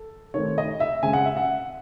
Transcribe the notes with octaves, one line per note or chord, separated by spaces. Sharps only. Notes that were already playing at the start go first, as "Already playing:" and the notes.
Already playing: A4
D#3 A3 C4 C#5
D#5
E5
C#3 G#3 C4 G#5
F#5
E5
F#5